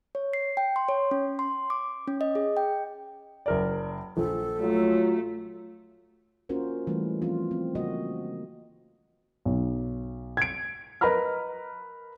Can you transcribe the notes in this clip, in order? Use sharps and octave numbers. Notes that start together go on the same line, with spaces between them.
C#5
C7
G5
C6
C#5
C#4
C6
D6
C#4
D#5
G#4
G5
F#1 A#4 D5
A#1 A4
F#3 A3 F4
A#3 C#4 F4 F#4 A#4 C5
E3 G3 A3 B4
F3 C4 C#4 F4
C4
C#3 G3 A#3 F#4 D#5
B1
G#6 D7
A#4 B4 D#5 A#5 B5 F6